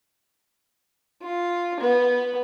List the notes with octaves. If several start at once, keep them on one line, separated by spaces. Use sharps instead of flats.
F4
B3